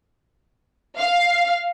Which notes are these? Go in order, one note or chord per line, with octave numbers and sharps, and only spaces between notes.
F5